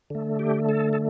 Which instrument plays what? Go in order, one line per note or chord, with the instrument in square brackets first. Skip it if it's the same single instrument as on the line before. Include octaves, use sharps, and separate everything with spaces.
[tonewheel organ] D3 A3
G4
A4
A4